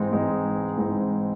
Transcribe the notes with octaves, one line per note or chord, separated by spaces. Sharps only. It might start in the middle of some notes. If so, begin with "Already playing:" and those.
Already playing: G#2 E3 G#3 C4 D#4
G#2 E3 G#3 C4 D#4
G#2 E3 G#3 C4 D#4